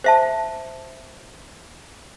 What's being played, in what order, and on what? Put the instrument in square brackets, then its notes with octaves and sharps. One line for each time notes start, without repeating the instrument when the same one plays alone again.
[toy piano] C5 E5 A5